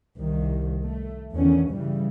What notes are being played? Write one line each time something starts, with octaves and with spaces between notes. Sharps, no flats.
C2 D#3
A3
E2 D3 D#3 C#4
G2 C#3 E3 G3